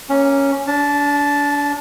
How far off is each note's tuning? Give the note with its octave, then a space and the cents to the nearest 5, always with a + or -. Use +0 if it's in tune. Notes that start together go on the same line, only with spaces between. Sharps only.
A#3 +0 C#4 +0
D4 -35 A5 +0